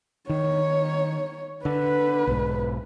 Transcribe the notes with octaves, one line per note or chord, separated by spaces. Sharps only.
D#3 C#5
D3 B4
B1 G#2